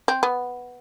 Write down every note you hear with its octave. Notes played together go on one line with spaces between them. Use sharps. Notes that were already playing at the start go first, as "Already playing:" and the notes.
C4
B3